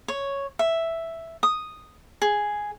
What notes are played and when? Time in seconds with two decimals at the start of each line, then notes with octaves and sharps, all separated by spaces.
0.08 C#5
0.59 E5
1.43 D#6
2.22 G#4